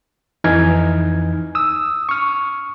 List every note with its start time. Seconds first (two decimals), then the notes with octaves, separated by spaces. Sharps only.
0.44 F2 E3 D#4 G#5 F6 G#6
1.55 D#6 E6
2.09 C#6 F6